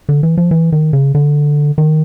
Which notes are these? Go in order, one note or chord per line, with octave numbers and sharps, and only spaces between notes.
D3
E3
F3
E3
D#3
C#3
D3
D#3